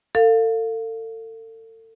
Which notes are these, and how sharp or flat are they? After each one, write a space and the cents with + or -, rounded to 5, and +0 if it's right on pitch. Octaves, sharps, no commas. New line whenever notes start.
A4 +35 F5 +10